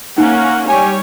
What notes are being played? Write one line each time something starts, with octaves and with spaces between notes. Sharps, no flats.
A#3 C#4 D#4 F#5
G3 G4 C#5 G#5